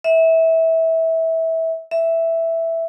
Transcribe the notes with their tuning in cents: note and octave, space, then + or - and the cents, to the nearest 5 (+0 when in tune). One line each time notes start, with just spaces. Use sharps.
E5 -20
E5 +0